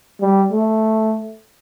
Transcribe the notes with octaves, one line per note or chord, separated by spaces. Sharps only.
G3
A3